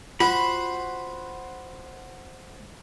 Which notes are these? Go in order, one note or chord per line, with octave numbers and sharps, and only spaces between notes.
F4 F#4 C5 B5